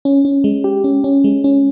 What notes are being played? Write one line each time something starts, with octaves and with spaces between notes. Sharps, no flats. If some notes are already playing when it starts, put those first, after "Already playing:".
C#4
C#4
G#3
G4
C#4
C#4
G#3
C#4